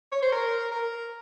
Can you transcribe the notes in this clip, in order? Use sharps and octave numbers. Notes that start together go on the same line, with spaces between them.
C#5
C5
A#4
A#4